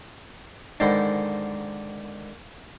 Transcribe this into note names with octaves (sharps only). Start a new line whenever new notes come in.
G#2 D3 D#3 C5 B5